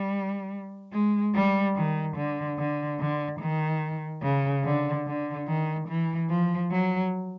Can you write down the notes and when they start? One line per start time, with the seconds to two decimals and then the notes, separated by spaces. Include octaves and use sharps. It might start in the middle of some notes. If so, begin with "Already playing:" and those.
Already playing: G3
0.92 G#3
1.34 G3
1.76 D#3
2.16 D3
2.58 D3
2.99 D3
3.40 D#3
4.23 C#3
4.64 D3
5.06 D3
5.48 D#3
5.88 E3
6.29 F3
6.71 F#3